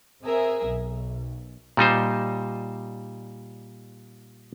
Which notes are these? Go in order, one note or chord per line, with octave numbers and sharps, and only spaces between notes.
C4 G#4 A#4 E5
B1
A#2 G3 D#4 C5